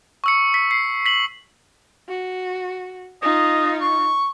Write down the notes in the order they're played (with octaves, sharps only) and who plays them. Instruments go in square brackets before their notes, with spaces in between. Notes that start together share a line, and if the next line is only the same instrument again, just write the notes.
[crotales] C#6 E6 C#7
B6
C7
B6 F#7
[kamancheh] F#4
[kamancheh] D#4 F4 [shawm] D#5
[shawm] C#6